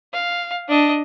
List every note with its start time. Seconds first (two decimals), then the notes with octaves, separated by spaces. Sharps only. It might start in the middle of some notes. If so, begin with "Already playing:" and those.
0.13 F5
0.68 D4 D#5